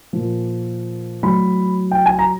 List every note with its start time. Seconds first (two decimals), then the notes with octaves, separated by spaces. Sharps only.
0.13 A#2 F3
1.23 A2 F#3 B5
1.91 G5
2.06 G#5
2.19 A#5